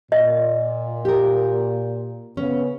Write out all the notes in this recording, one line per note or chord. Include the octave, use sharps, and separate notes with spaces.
A#2 D#5
G4 A#4
C#3 B3 C#4